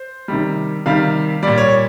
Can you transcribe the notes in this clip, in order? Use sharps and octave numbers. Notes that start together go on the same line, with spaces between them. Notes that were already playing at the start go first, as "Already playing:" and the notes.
Already playing: C5
C3 D#3 G3
C3 D#3 G3 F5
A#2 G3 D5
C#5